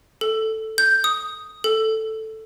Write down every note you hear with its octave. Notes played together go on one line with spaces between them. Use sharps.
A4
G6
D#6
A4